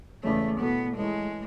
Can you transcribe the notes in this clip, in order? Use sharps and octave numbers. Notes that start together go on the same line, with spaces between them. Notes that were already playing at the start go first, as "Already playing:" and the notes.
E2 C#3 G#3 A3 C#4
B2 A3 B3 E4 A4
E3 G#3 A3 C#4 E4 G#4